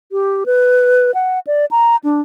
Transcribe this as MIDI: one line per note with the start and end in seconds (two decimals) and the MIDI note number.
0.12 0.44 67
0.46 1.11 71
1.14 1.39 78
1.47 1.65 74
1.71 1.96 82
2.04 2.21 62